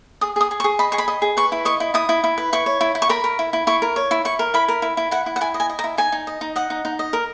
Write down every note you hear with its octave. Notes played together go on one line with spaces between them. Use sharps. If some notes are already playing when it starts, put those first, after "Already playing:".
G#4 D#6
G#4 D#6
G#4
C#6
G#4
D#5 B5
G#4 C#6
B5
D#5
G#4
B4 C#6
E4
D#5 C#6
E4
E4 D#6
E4
E4
B4
E4 C#6
C#5
E4
E4
C#6
A#4 B5
A#4
E4
E4
E4 C#6
A#4
C#5
E4
E4 C#6
A#4
E4 B5
A#4
E4
E4
E4 F#5
E4
F#5
E4 G#5
D#5
G#5
D#5
A#5
E4
D#4 G#5
D#4
D#5
D#4
D#5 F#5
D#4
D#4
D#5
A#4